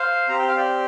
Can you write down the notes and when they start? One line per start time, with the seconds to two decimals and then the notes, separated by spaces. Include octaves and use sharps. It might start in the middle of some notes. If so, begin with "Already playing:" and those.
Already playing: C5 F5
0.29 C4 G4 A#5
0.38 G5
0.48 F5
0.57 D5 G5